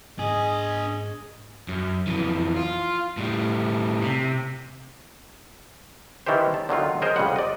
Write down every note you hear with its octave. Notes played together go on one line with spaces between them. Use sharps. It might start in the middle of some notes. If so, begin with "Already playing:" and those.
G#2 D4 G#4 D#5 G#5
F#2
F2 E3
F4
A2 G3
C3
D#3 E3 C#4 G4 C5
A5
D3 D#3 F#3 F4
G#4 A#4 C5 D#5
F2 C#3 G3 F#5
D5 D#5